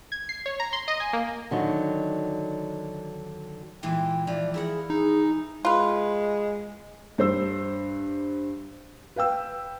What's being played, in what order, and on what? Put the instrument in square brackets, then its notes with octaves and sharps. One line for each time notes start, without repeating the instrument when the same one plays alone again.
[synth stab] G#6
C7
C#5
A#5
C6
D#5
G#5
A#3
[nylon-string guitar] D3 D#3 F#3
[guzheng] A#2 E3 G#3 [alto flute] G5
[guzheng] E3 F3 [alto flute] D5
[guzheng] E4 A#4 F#5 [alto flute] G#4
[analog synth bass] D#4 [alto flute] G#4
[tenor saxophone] G#3 [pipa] F4 B4
[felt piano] G2 C5 E6
B4 F5 G5 E6